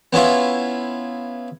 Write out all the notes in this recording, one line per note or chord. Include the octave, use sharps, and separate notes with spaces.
B3 C#4 E4 F4